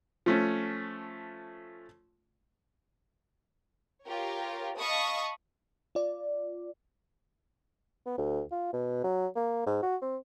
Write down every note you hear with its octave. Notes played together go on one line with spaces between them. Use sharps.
F3 A3 C#4
F4 G4 A#4 C#5
D#5 F5 A5 B5 C#6 D#6
F4 D5
B3
D2
F4
B2
F#3
A#3
G#2
F#4
C4